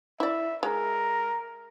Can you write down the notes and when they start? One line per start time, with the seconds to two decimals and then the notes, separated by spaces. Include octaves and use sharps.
0.20 E4 D5 E5
0.63 G#3 A#4